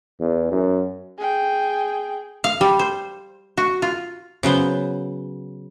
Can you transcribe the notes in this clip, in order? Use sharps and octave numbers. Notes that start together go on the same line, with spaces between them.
E2
F#2
G#4 G5
F5
G3
C5
F#4
F4
C#3 F#3 B3 C5